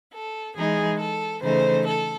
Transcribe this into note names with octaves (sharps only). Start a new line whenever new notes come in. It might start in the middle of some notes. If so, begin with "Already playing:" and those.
A4
E3 G#3 D#4 G#4
A4
C#3 E3 A3 D#4 C5
A4